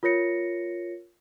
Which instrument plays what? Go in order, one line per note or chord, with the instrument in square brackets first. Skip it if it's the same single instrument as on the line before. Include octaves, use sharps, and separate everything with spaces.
[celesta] F4 A#4 C#5 A#6 C#7